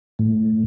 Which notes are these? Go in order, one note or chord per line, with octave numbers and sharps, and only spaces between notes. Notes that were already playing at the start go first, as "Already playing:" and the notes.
A2